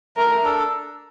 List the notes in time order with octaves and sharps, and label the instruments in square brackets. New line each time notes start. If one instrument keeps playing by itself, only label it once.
[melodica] A3 [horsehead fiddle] A#4
[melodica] D4 A4